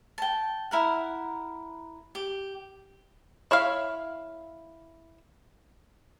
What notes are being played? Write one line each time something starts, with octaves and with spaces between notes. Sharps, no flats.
G5 A5
E4 A#4 F#5
G4
E4 C#5 E5 F5